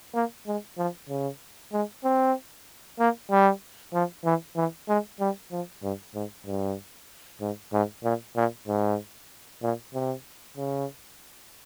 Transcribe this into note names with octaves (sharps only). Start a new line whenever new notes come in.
A#3
G#3
F3
C#3
G#3
C4
A#3
G3
F3
E3
E3
G#3
G3
F3
G2
G#2
G2
G#2
G#2
A#2
A#2
G#2
A#2
C3
C#3